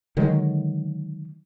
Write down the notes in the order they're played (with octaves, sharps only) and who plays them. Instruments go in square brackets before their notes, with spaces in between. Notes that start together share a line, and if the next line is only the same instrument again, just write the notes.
[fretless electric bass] D3 D#3 F#3 G#3